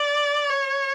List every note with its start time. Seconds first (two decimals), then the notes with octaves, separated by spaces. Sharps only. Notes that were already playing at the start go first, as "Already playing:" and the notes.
Already playing: D5
0.50 C#5